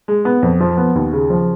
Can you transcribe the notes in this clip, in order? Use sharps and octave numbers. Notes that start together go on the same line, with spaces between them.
G#3
B3
F2
F3
B3
D#2
C#3
F3